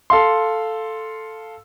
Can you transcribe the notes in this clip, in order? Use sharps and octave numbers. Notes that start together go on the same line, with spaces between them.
A4 F5 C6